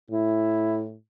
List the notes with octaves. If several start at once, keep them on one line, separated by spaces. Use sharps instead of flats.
A2 E4